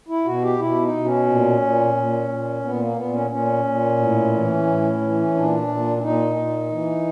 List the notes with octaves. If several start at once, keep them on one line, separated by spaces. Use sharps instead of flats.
E4
B2 F#4
G4
B2 E4
D#4
B2
C#4
A#2
A#2
A#2
A#2
A#2 B3
A#3
A#2 B3
C#4
A#2 C#4
A#2
A2
E3
A2
E3
A#2 D4
A#2
D4
A#2 D#4
A#2
E3